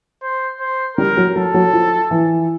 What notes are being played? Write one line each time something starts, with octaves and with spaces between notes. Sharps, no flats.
C5
C5
G3 A#4
F#3
F#3 A4
F#3
F3
E3